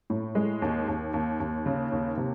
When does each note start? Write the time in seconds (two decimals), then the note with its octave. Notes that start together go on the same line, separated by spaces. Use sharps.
0.10 A2
0.35 G#3
0.62 D#2
0.88 D#2
1.14 D#2
1.40 D#2
1.66 C#3
1.92 D#2
2.17 C3